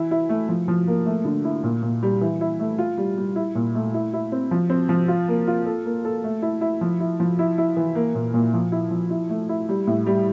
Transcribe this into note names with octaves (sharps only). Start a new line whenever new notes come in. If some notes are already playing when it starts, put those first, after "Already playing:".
Already playing: E3 E4
E4
A3
F3
F3
A#3
A3
D3
E4
A#2
A#2
G3
E3
E4
A3
F4
G3
G3
E4
A#2
A3
E4
E4
C4
F3
C4
F3
F4
A#3
F4
A4
A#3
A4
A3
E4
E4
F3
E4
F3
E4
E4
E3
A#3
A#2
A#2
F3
E4
F3
E4
A3
E4
G3
A2
G3